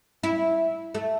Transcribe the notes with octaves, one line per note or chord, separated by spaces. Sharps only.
E4
A3